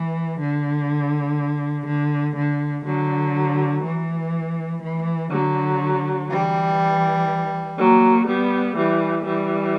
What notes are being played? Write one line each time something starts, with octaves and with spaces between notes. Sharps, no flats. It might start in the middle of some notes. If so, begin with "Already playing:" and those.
Already playing: E3
D3
D3
D3
D3 F#3
E3
E3
D3 F#3
E3 G3
F#3 A#3
G3 B3
E3 G3
E3 G3